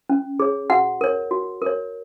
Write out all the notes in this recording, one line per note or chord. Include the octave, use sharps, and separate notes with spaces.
C#4
G#4 C#5
F#4 F#5
A#4 C#5
F#4
A#4 C#5